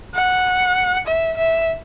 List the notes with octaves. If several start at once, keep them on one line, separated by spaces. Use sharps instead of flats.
F#5
E5
E5